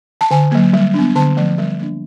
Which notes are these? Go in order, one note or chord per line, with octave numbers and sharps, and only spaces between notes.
A5
D3 G#5
F#3 A#3
G3
B3 D4
D3 A5
F3 A3
G3
A#3 D4